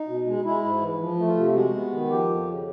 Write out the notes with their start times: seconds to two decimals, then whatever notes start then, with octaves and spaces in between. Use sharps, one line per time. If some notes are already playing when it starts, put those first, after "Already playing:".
Already playing: D#4
0.08 B2
0.27 G#3
0.45 G#3 E4
0.64 G#2
0.81 E3
1.00 F3
1.19 A3
1.27 F4
1.37 C3
1.55 G#3 F#4
1.74 B3
1.92 D#3
2.10 F3 G4
2.29 F2
2.48 C#3